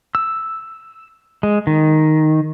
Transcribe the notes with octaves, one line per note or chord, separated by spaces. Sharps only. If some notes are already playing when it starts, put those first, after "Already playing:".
E6
G#3
D#3